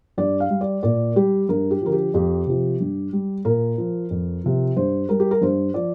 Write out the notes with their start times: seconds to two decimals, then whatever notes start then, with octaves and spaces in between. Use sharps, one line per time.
0.18 G2 D5
0.40 F5
0.50 G3
0.61 D5
0.83 A#2 D5
1.16 G3 G4
1.49 G2 A#4
1.71 G4
1.82 D3 F3 A#4
1.92 G4
2.14 F2 G4
2.47 C3 F3
2.80 G2
3.13 G3
3.45 A#2 A#4
3.78 F3
4.10 F2
4.44 C3 F3
4.76 G2 C5
5.09 G3 A#4
5.20 G4
5.31 A#4
5.41 G2 C5
5.74 F3 D5